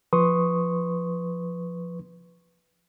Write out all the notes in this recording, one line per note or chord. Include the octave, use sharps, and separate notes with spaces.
F3 B4 C6 C#6 D#6